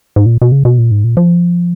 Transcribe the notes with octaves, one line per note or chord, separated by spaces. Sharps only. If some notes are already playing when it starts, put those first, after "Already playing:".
G#2
A#2
B2
C#3
B2
A#2
G#2
A#2
F3